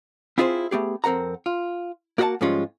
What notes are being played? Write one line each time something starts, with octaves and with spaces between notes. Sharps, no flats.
C4 E4 F4 G#4 A4 C5
A3 B3 G4 G#4
F2 C4 A#4 F#5 A#5
F4
A#3 F#4 G4 D#5 F#5 A5
G#2 F3 G3 G#3 C#4 F4